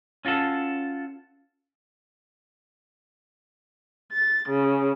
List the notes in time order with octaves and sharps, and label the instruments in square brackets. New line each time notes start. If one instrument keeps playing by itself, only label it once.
[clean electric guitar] C#4 F4 F#4 A4
[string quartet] A6
C#3